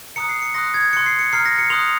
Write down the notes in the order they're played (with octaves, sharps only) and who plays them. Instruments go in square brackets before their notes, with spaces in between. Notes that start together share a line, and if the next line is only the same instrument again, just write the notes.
[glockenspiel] A#5 D#6 F#6 C#7
C7
C#7
C6 D#6 F#6 A#6
G#6
C6 F#6 C#7
C7
C#7
A#5 F6 C7
A#6
C#7
C6 D#6 F#6 F7